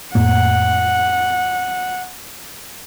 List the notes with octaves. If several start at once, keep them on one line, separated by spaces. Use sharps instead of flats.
F2 A2 A#3 F#5